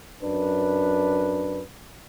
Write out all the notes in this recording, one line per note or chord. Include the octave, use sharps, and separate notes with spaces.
F#2 D4 B4